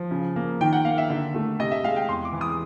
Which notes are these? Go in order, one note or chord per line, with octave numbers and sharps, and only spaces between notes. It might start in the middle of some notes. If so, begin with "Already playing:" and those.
Already playing: F3
C#3
A#3
D#3 G5
F#5
A#3 F5
E5
D3
A3
C3 D#5
E5
G#3 F5
G5
E2 C6
D6
E3
D#6